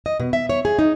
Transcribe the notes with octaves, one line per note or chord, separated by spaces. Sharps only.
D#5
B2
E5
C#5
G#4
D#4